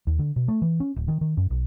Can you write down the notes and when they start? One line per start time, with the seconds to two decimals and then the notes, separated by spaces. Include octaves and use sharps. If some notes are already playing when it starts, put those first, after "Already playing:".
0.07 D#2
0.19 D3
0.36 B2
0.48 A3
0.62 E3
0.80 C#4
0.96 D1
1.08 D#3
1.21 D#3
1.37 F#2
1.50 B1